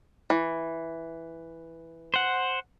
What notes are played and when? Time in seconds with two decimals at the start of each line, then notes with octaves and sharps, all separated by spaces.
0.30 E3
2.14 C5 F#5